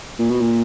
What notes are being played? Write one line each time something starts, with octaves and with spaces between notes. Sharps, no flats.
A#2
B2
A#2